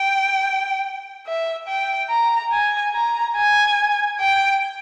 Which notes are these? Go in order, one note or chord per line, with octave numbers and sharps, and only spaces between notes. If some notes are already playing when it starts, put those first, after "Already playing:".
Already playing: G5
E5
G5
A#5
G#5
A#5
G#5
G5